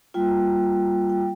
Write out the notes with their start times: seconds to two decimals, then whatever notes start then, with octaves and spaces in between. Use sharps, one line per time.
0.14 G3 A#3 F4 G5
1.10 G5